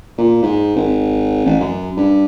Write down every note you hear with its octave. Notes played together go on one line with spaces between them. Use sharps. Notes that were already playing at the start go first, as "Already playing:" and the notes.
A#2
G#2
G#1
A1
F#2
G2